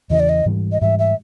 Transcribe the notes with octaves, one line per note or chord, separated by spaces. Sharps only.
E2 C#3 E3 D#5
D5
D#5
G#2 E3 G3
D#5
G#2 E3 G3 E5
E5